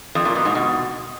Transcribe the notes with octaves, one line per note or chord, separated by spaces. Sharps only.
F2
A#2
B2
G#2
B2